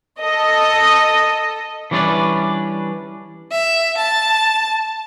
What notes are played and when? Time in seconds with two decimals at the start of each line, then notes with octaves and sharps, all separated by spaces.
0.20 A4 D#5
1.91 E3 G3 C#4 D4 B4 D5
3.50 E5
3.96 A5